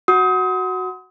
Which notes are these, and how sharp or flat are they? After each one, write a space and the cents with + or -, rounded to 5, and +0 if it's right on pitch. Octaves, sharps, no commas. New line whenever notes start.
F#4 +0 D#6 +30